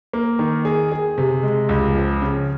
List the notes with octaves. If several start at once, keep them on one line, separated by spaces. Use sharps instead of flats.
A#3
D#3
G#4
G#4
C3
G#3
C#2
F3
C#3